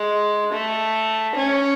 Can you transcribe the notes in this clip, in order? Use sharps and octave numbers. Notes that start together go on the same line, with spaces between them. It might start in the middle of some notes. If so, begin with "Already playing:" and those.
Already playing: G#3
A3
C#4